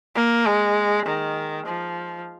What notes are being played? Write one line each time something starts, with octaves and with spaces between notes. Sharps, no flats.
A#3
G#3
D#3
F3